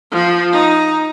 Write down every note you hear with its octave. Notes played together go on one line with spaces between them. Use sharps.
F3
D#4